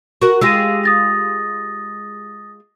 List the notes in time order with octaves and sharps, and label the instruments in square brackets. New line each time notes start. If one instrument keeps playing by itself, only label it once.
[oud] F#4 A#4 [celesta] C#6
[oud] G#3 F4 G4 [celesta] E6 A#6 D#7
[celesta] D#6 A6 A#6